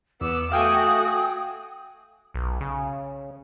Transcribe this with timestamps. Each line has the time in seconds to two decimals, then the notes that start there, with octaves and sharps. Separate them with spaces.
0.21 E2 B3 D6 E6
0.52 A3 F#4 F5 G5 G#5 D#6
2.34 B1
2.61 C#3